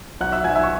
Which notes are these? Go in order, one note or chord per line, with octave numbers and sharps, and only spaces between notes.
B1 F#5 F#6
E5 E6
B1 G#5 G#6
E5 E6
C#6